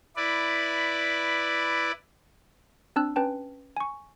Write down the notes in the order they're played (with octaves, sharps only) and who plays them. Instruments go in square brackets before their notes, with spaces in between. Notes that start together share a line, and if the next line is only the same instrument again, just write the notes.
[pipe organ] E4 B4 D5
[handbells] C4 D4 A5 E6 F#6
C#4 B4 G5 A5
G#5 C#6